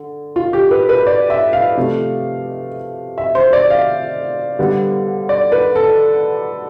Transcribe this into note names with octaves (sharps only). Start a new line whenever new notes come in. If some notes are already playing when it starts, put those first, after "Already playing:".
Already playing: D3
F4
G4
B4
B4
D5
E5
F5
C3 F3 A3
E5
C5
D5
F5
D3 G3 B3
D5
B4
A4